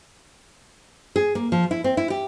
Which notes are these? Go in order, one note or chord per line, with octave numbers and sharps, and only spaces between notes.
G#4
A#3
F3
E4
C4
E4
G4